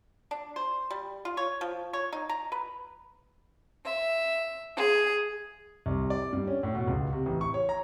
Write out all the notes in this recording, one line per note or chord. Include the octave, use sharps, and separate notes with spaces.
D4
C5
G3
F4
C#5
F3
C#5
D#4
A#5
B4
E5
G#4
C2
D5
G2
C#4
A2
B2
C#2
C3
A1
C#6
C#5
A#5